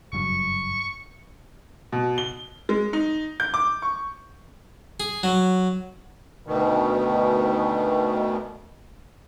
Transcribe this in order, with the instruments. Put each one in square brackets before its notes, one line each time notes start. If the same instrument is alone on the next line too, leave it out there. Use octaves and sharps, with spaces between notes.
[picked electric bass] F#1 G2 F#3 [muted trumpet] C#6
[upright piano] B2
G7
G#3
D#4
G6
D6
C#6
[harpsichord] G#4
F#3
[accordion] D2 B2 D#3